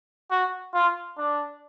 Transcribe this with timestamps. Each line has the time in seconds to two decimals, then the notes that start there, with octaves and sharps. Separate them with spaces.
0.31 F#4
0.74 F4
1.18 D4